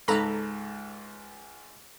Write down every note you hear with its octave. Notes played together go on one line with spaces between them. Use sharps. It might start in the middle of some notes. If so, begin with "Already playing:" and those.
C#2 G#2 A4 A#5 B5